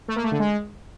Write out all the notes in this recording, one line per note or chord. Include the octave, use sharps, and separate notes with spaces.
A3
A#3
A3
D3
G#3